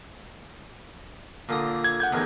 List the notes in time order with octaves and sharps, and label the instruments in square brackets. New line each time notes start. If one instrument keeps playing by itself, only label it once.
[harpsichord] A#2 D3 D#6
[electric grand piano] G#6
F#5 G6 G#6
[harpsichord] E2 A2 D#3